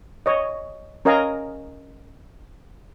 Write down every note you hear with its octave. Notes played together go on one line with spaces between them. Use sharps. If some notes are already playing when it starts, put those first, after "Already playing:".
C#5 D#5
C#4 A#4 D#5 F5 G#5 A#5